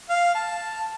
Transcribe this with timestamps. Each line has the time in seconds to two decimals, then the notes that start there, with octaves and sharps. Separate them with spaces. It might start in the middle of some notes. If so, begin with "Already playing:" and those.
0.10 F5
0.35 A5